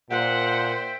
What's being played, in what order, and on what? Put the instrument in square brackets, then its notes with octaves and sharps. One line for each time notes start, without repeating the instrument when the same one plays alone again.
[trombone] A#2 [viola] C5 [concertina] E5 G5 [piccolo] F#5